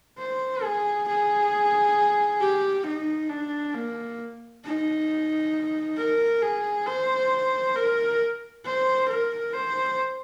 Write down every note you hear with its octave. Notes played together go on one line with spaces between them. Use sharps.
C5
G#4
G#4
G4
D#4
D4
A#3
D#4
A#4
G#4
C5
A#4
C5
A#4
C5